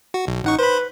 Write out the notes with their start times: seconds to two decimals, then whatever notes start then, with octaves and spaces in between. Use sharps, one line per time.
0.14 F#4
0.27 B1
0.44 A1 D#4 F#5 C#6
0.59 B4 C5 B5